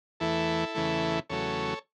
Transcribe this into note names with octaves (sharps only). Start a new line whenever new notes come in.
E2 E3 A3 E4 A4
E2 C#3 E3 A3
E2 C#3 F#3 A3 A4 C#5